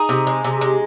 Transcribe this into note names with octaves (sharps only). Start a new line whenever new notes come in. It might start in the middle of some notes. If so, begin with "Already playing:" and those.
Already playing: D#4 G#4
C3
G#3
C3
G#3